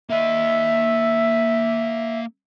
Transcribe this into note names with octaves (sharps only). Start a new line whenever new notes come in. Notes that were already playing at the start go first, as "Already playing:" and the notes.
A#3 D#5 E5